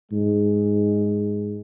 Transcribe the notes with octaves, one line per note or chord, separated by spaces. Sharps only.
G#2 G#3